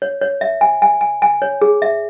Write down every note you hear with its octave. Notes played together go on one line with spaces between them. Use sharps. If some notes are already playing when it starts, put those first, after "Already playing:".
C#5
C#5
E5
G#5
G#5
G#5
G#5
C#5
G#4
E5